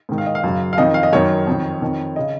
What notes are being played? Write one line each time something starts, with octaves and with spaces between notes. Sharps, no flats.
G#2 D#3
F5
D#5
F5
F#2 C#3
F5
F2 D#3 D#5
F5
D#5
F#2 D#3 C#5
F2 D#3
F2 D#3
C#3 D#5